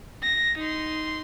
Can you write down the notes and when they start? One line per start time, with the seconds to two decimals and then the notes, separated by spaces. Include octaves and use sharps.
0.22 A#6
0.58 D#4 C6